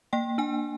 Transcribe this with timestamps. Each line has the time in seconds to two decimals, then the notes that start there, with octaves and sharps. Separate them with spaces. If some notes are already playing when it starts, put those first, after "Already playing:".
0.13 A#3 G5
0.38 D4 G#5